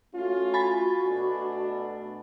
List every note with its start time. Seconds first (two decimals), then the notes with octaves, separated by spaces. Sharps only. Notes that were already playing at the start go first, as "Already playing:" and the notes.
0.14 A3 C#4 F4 F#4
0.54 G#5 B5 A6
1.06 B2 A3 D4